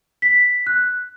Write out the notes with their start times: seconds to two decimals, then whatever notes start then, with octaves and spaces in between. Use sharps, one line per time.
0.22 B6
0.67 F#6